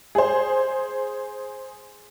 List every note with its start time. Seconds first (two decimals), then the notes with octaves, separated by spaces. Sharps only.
0.15 G#4 C5